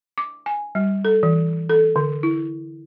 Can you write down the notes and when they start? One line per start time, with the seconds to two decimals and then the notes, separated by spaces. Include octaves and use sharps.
0.18 D6
0.46 G#5
0.75 G3
1.05 A4
1.23 E3
1.70 A4
1.96 D3
2.23 E4